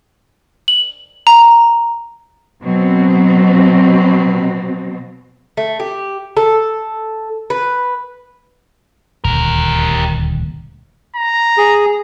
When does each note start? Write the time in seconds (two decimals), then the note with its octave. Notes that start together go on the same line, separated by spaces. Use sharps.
0.68 F#7
1.27 A#5
2.63 B2 F#3 C4
5.57 A3
5.80 G4
6.37 A4
7.50 B4
9.24 D#1 D2 G4 A#4
11.16 A#5
11.58 G#4